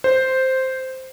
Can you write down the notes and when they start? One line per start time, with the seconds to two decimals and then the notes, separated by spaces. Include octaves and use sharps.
0.04 C5